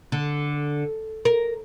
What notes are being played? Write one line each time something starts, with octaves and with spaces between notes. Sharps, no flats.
D3
A#4